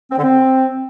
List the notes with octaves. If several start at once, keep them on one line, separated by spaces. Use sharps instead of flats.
C4
D3
C4